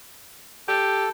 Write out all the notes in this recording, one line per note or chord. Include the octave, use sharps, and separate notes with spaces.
G4 A4